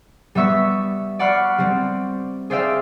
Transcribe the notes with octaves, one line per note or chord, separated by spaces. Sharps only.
G3 B3 E5 C#6 B6
D5 F#5 B5 C#6 F6 C7
G3 C4
G#4 C5 D5 E5 F5 G5